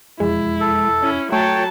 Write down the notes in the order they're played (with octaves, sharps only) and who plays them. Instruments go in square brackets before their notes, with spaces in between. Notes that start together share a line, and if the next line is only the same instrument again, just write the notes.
[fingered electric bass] E1 F2 [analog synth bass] G#3 [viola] E4
[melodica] A4
[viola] C#4 E4
[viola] F#3 A5 [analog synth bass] A3 [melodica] C#5 G5